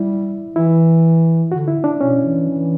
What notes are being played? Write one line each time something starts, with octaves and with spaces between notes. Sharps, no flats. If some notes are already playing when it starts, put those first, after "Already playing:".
Already playing: G3 E4
E3 E4
D3 F#4
E4
D4
B2 C#4
E3
E3